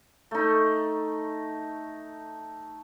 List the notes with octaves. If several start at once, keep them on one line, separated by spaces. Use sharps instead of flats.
A3 D#4